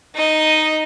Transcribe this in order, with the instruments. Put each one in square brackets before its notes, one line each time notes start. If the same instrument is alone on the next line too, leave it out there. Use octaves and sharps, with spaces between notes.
[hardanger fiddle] D#4 D#5